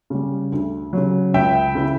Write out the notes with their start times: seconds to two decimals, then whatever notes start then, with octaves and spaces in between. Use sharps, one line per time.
0.10 C#3 G3
0.52 D2
0.93 C#3 F#3
1.34 C#2 E5 G5
1.75 C#3 E3